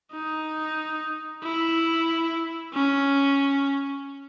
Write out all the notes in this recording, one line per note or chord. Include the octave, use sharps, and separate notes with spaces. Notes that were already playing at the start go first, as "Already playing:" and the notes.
D#4
E4
C#4